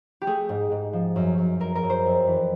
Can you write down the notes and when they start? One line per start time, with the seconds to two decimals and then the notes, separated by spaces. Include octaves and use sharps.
0.22 G4
0.27 A3 G#4
0.49 G#2
0.72 G#2
0.93 F3
1.16 F#2
1.38 F#2
1.60 F#2 A#4
1.75 A#4
1.83 F#2
1.90 C5
2.05 F2
2.27 E3